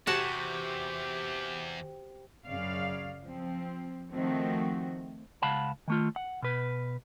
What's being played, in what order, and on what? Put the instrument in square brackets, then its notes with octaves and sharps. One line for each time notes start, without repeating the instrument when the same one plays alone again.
[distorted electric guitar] E2 [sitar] C3 [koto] F#4 F#5 A5 [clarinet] G4
[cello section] F#2 C#3 D5 F5
F3 C4
D#3 F3 A3 C4 F#4
[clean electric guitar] C#2 F5 F#5 A5 B5
D#3 A3 F4
F#5
B2 B4